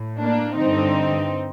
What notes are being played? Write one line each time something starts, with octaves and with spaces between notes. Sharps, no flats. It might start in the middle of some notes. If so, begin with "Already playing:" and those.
Already playing: A2
A#3 D4
G2 D3 C4 D#4